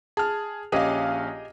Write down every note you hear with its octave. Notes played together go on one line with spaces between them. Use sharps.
G#4 A5 F6
A#1 C#4 G4 G#4 D#5 F5